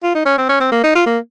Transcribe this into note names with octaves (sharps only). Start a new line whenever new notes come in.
F4
D#4
C#4
C4
C#4
C4
A#3
D#4
F4
A#3